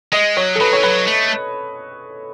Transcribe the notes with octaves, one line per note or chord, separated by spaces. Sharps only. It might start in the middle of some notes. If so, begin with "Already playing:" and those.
G#3 D#5
F#3 C#5
A4
F#3 B4
E3 C#5
F#3 B4
A3